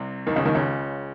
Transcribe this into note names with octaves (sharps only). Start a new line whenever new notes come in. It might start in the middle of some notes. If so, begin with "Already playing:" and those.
Already playing: C2 C3
D#2 D#3
C#2 C#3
D#2 D#3
C#2 C#3